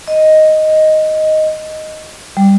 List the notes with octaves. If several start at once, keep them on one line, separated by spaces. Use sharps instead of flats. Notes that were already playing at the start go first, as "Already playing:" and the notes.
D#5
G3